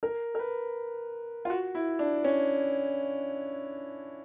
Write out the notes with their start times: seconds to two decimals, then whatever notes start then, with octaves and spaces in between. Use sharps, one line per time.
0.03 A#4
0.35 A#4
0.39 B4
1.45 F4
1.50 F#4
1.75 E4
1.99 D4
2.24 C#4